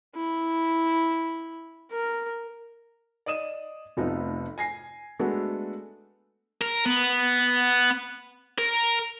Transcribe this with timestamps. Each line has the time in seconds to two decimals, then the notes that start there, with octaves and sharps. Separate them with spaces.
0.15 E4
1.91 A#4
3.26 D5 D#5 D#6 D#7 E7
3.97 F1 C3 F3 A3 B3 D#4
4.58 G#5 A#6 C7
5.19 G#3 A3 B3 D4 F#4 A4
6.62 A#4
6.85 B3
8.58 A#4